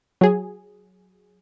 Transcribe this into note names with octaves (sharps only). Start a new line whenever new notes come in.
F#3 G#4